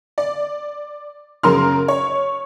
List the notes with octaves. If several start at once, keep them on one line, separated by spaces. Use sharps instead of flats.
D5
F#2 C#3 A#4 C6 F6
C#5